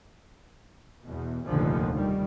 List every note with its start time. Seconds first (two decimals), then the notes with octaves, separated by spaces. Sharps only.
1.03 E2 B2
1.47 F1 A#1 D#2 A#2 D3 F3
1.95 D#3 G3